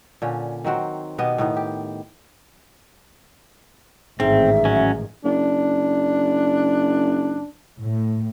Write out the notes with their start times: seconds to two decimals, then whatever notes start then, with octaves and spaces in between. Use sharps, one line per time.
0.22 A#2 D3 C#4
0.65 D#3 F#3 C4 F#4
1.18 B2 B3 G4 D#5
1.38 A2 D#3 B3
1.56 G4
4.20 A1 G#2 D#3 C4 E5
4.65 F#3 C#4
5.24 F#1 D4
7.81 A2